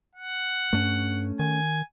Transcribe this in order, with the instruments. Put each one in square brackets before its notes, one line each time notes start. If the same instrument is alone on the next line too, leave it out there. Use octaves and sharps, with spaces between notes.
[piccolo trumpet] F#5
[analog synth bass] G2 [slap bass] A3 C#4
[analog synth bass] D#3 [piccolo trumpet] G#5